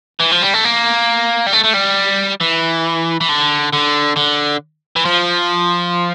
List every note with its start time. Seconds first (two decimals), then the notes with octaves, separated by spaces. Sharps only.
0.20 E3
0.32 F3
0.42 G3
0.54 A3
0.64 A#3
1.46 G3
1.53 A3
1.64 A3
1.74 G3
2.41 E3
3.21 E3
3.29 D3
3.73 D3
4.17 D3
4.96 E3
5.05 F3